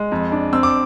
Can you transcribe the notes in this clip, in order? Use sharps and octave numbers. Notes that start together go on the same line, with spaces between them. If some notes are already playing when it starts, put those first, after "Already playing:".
Already playing: G#3
F2
D4
C4 E6
D6